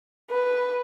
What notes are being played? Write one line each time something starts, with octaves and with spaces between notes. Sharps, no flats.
B4